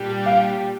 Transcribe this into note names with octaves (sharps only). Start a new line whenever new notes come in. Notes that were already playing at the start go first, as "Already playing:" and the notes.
Already playing: A#2 G3 D4 G4
F5